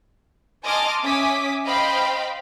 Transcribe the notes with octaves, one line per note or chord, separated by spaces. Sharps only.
D#5 G#5 A5 C6 D6 F6
C#4 E5 G#5 D6 D#6 B6
C5 D#5 F5 G5 B5